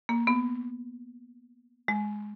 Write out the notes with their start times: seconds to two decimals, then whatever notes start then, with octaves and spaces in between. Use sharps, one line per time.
0.09 A#3
0.27 B3
1.88 G#3